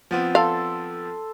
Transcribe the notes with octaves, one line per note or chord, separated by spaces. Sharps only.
F3 B3 C4
A4 D5 F5 C6